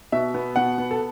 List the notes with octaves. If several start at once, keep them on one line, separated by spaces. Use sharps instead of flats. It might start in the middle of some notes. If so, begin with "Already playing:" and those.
B2 E5
B3
B2 F#5
B3
A4